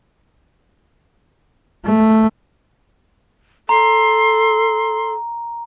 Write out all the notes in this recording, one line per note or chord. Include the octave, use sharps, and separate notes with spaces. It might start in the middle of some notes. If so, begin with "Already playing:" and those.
A3
A4 A#5 C6